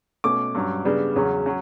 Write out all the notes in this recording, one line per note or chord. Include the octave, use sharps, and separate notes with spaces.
B2 A3 C#4 D6
G2 F#3 C#4
C#3 G3 B3 D4
E2 C#3 F#3 C#4
F#3 C#4